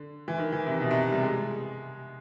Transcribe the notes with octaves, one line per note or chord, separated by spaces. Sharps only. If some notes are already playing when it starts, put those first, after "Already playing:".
Already playing: D3
E3
D#3
E3
C3
B2
C3
G3
G#3